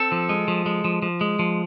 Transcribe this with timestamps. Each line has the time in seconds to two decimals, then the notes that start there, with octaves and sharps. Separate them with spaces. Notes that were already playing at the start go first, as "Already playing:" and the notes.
Already playing: C4 A4
0.12 F3
0.29 G#3
0.48 F3
0.66 G#3
0.84 F3
1.02 F3
1.21 G#3
1.39 F3